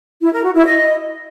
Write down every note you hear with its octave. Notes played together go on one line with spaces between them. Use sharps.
E4
A#4
F#4
E4
D#5